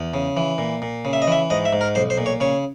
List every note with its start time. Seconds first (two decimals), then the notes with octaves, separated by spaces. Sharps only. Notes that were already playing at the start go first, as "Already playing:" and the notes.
Already playing: E2
0.14 C#3
0.37 E3
0.58 A#2
0.82 A#2
1.05 C#3
1.13 E5
1.22 D#5
1.27 E3 E5
1.50 G#2 D#5
1.65 E5
1.73 G#2
1.81 A#4
1.95 B1 C5
2.10 C5
2.18 A#2
2.26 C#5
2.40 C#3 C#5